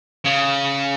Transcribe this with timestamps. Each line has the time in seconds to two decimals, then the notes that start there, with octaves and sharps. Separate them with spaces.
0.25 C#3